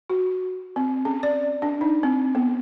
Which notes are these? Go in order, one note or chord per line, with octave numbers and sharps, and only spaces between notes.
F#4
C4
C#4
D5
D4
D#4
C4
B3